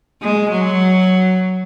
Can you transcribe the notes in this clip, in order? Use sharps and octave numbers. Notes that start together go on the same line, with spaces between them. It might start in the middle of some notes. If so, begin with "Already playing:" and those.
G#3
F#3